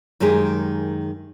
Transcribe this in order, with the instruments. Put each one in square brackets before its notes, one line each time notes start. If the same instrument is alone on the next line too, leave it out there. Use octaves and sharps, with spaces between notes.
[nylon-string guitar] F#2 D#3 G#3 G4 G#4